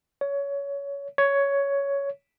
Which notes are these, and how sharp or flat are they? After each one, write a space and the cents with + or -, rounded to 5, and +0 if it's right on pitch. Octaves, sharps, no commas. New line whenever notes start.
C#5 +20
C#5 +10